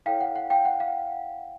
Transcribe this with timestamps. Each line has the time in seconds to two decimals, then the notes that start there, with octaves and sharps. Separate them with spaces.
0.06 E4 A4 C#5 F5 G5
0.21 F#5
0.36 F#5
0.50 F5 G5
0.65 F#5
0.80 F5